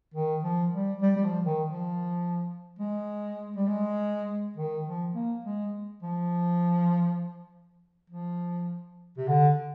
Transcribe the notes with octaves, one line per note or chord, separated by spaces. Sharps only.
D#3
F3
G3
G3
G3
F3
D#3
F3
G#3
G3
G#3
D#3
F3
A#3
G#3
F3
F3
C3
D3